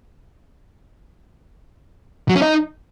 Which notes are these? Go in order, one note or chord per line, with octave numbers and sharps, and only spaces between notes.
F#3
C#4
D#4